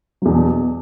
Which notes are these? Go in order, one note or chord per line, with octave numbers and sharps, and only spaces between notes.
E2 B2 F#3